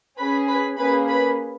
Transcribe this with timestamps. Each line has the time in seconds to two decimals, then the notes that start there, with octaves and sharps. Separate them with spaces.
0.17 C#4 G#4 B4 B5
0.47 B4 B5
0.77 A#3 C#4 G#4 B4 B5
1.08 B4 B5